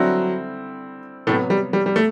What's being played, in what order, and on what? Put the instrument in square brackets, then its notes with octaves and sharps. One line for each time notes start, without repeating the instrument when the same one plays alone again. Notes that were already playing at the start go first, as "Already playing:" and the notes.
Already playing: [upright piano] D3 G3 C4 E4 [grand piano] F#3
[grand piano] A2 A3 [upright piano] C3 F#3 B3
[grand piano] G3
G3
G3
A3